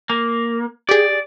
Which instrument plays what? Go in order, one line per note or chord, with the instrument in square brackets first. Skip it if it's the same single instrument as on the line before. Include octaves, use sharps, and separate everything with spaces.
[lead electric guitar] A#3
[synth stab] G4 G#4 [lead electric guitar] D5